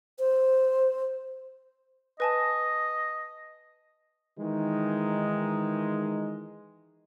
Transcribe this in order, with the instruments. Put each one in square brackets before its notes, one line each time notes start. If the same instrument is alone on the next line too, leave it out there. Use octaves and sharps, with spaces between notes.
[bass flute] C5
[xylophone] B4 G#5 A5 [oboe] D#5
[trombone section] D#3 E3 G#3 D#4